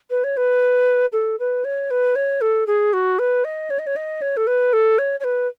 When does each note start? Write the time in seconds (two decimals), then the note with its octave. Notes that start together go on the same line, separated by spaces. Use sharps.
0.10 B4
0.24 C#5
0.37 B4
1.13 A4
1.39 B4
1.65 C#5
1.91 B4
2.16 C#5
2.41 A4
2.67 G#4
2.93 F#4
3.19 B4
3.45 D#5
3.70 C#5
3.79 D#5
3.87 C#5
3.96 D#5
4.22 C#5
4.37 A4
4.47 B4
4.73 A4
4.99 C#5
5.20 C#5
5.24 B4